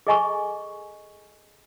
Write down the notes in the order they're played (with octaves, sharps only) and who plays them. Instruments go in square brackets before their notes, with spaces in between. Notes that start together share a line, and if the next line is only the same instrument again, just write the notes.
[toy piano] G#4 A4 D#5 G#5 A#5 C#6